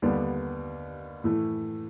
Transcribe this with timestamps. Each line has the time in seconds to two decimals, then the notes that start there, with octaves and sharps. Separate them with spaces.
0.02 D#2 D3 G3 B3 D4
1.24 A2 E3 A3